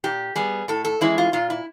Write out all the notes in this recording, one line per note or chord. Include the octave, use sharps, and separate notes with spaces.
A#2 G4
G3 B3 G#4
A2 A4
A4
E3 G#3 C#4 E4
F4
A#2 F4
E4